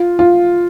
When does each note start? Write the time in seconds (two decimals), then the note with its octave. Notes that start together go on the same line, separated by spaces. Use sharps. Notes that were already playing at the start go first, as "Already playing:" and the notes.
Already playing: F4
0.19 F4